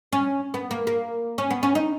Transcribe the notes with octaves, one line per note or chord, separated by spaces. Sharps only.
C#4
B3
A#3
A#3
C#4
B3
C#4
D#4